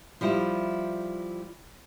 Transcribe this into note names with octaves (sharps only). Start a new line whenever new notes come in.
F3 G3 E4